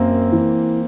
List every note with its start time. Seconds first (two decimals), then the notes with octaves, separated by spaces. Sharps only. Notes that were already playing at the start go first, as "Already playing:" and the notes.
Already playing: F#2 A#3 C4
0.32 E3